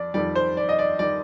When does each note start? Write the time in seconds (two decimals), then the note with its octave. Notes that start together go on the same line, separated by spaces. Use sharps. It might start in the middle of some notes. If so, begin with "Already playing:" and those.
Already playing: F2 D5
0.14 F2 D#3 G3 D5
0.35 C5
0.57 D5
0.69 D#5
0.79 D5
0.99 D#3 G3 D5